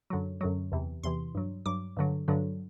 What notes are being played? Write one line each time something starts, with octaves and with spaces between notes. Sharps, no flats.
F#2 D3 F#3
F#2 D3 F#3
E2 C3 E3
E2 C3 E3 C6
G2 F#3
G2 F#3 D6
G2 D3 F#3
G2 D3 F#3